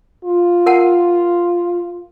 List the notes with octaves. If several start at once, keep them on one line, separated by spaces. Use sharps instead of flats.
F4
A#4 F#5 A5